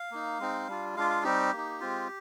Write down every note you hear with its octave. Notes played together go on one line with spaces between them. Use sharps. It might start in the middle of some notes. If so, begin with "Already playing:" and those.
Already playing: F5
A#3 D#4
G#3 C4 D#4
G3 D4 F4
G#3 D4 F4 F5
F5
G3 C4 D#4 G4
A#3
D#4
G#3 C4 F4